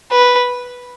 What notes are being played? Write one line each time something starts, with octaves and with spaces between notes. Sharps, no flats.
B4